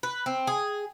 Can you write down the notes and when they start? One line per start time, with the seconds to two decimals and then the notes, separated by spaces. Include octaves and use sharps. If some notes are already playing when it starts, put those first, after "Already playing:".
0.03 B4
0.26 C4
0.47 G#4